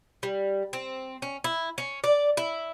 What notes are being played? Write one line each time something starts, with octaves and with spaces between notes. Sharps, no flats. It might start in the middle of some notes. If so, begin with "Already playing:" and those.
G3
C4
C#4
E4
C#4
D5
E4